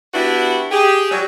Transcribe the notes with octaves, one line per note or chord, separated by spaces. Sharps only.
B3 D4 E4 F#4 G4 B4
G4 G#4
F#3 G3